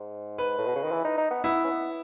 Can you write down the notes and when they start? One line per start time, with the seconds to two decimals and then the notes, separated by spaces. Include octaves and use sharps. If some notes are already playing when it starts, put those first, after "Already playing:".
Already playing: G#2
0.38 B4
0.58 A2
0.66 B2
0.75 C#3
0.83 D#3
0.92 E3
1.04 D#4
1.18 D#4
1.31 B3
1.44 B3 E4
1.65 C#4
1.71 B3